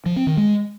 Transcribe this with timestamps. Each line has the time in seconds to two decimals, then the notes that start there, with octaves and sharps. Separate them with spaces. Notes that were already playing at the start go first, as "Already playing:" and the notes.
0.06 F3
0.16 C4
0.27 D#3
0.37 G#3